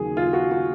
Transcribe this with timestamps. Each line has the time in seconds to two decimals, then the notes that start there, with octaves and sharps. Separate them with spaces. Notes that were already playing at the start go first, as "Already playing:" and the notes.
Already playing: D#2 C#3 F#3 G#4
0.17 F4
0.33 F#4
0.51 F#4